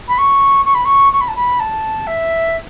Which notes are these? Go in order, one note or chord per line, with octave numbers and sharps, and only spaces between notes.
B5
C#6
C#6
B5
C#6
C#6
B5
A5
B5
A5
E5